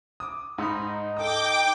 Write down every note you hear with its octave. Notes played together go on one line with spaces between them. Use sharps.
D6 D#6
G#2 D#4 B5
A4 G5 D6 D#6